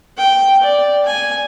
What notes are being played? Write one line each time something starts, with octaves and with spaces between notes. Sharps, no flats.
G5
D5
G#5